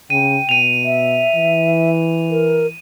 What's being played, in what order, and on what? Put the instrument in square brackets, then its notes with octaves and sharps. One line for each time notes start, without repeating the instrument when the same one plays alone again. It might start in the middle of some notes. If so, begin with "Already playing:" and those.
[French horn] C#3 [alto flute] G5 [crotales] D#7
[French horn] B2 [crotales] D#7 F7
[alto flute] E5
[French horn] E3
[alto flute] A#4